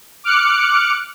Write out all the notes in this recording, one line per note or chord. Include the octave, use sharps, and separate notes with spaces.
D6 F6 F#6 C#7